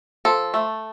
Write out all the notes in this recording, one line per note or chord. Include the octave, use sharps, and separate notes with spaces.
F3 A4
A3